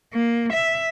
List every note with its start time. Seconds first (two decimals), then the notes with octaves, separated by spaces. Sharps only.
0.13 A#3
0.52 E5